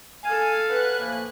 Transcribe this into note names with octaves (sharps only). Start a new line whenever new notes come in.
A4 F5 G#5
C#3 B4 F#5 G#5 F#6
A2 F3 A#3